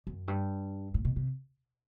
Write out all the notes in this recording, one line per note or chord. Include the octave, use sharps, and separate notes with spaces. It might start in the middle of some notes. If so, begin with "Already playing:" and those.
F#2
G2
A2
B2
C3